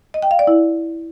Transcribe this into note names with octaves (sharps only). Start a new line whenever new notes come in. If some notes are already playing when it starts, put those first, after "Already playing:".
D#5
G5
F5
D5
E4